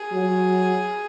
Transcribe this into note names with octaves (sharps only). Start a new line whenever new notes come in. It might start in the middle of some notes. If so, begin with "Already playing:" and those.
Already playing: G#4
F#3